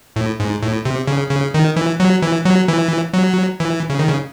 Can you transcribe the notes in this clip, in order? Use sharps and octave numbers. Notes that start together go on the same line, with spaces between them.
A2
G#2
A2
C3
C#3
C#3
D#3
E3
F#3
E3
F#3
E3
F#3
E3
C#3
D#3
C#3